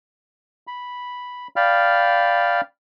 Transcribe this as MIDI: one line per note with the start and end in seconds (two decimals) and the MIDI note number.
0.67 1.48 83
1.56 2.61 74
1.56 2.61 77
1.56 2.61 79
1.56 2.61 83
1.56 2.61 89